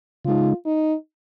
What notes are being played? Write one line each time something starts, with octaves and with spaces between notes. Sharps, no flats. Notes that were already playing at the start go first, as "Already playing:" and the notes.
C#3 G#3 D#4 F4
D#4